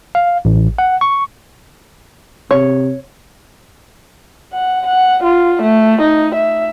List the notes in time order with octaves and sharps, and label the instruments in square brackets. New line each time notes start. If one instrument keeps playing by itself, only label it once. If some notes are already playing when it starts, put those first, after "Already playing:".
[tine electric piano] F5
A1
F#5
C#6
[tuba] C3 [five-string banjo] C#5
[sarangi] F#5
F#5
F4
A3
D#4
E5